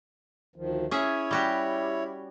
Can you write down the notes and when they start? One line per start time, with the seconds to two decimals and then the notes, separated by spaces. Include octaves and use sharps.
0.56 D2 D#3 F3
0.91 C#4 E4 G#4 C#5 E5
1.31 G3 F#4 G4